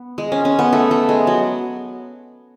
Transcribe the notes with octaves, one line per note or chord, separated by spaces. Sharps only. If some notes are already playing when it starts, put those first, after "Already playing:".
Already playing: B3
G#3
C#4
C#4
B3
A3
A3
G#3
F#3